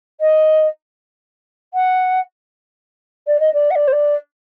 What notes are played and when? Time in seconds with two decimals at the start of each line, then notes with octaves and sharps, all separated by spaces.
0.21 D#5
1.74 F#5
3.27 D5
3.40 D#5
3.53 D5
3.70 F#5
3.75 D5
3.87 C5
3.92 D5